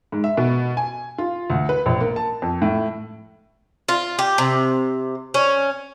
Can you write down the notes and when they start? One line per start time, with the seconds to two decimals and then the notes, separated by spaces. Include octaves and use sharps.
0.12 G#2
0.24 E5
0.37 B2
0.77 G#5
1.18 F4
1.50 D2
1.69 B4
1.86 A#1
2.01 A#3
2.16 A5
2.42 F2
2.62 A2
3.88 F4
4.19 G4
4.38 C3
5.34 C#4